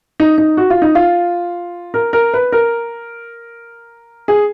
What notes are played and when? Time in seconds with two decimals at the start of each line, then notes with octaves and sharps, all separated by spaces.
0.20 D#4
0.38 D#4
0.57 F#4
0.70 F4
0.82 D#4
0.95 F4
1.94 A#4
2.13 A#4
2.34 B4
2.52 A#4
4.28 G#4